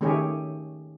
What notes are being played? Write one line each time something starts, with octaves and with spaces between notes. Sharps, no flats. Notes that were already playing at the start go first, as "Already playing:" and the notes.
D#3 A3 C#4 G4 G#4 C#5